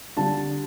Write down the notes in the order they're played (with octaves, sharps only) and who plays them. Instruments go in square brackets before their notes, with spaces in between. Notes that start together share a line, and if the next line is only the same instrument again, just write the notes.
[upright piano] D3 G3 A5